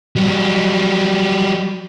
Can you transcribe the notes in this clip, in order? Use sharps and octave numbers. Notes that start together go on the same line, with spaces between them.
F#3 G3